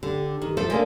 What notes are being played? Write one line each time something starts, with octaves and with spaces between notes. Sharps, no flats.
D3 G4
D#3
F3 A4 E5
G#3 A#3 D4